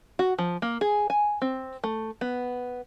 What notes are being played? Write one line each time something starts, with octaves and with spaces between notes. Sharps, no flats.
F#4
F3
A#3
G#4
G#5
C4
A3
B3